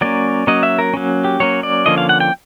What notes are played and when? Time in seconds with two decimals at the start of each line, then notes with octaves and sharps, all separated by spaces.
0.01 F#3 A#3 C#4 D5
0.47 F#3 A#3 C#4 D#5
0.63 E5
0.79 A#4
0.94 F#3 A#3 C#4
1.24 G4
1.40 F#3 A#3 C#4 C#5
1.63 D5
1.86 D3 F3 A#3 C#4 D#5
1.98 F5
2.09 F#5
2.20 G5